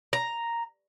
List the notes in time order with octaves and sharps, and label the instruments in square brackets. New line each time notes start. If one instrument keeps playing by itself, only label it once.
[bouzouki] A#5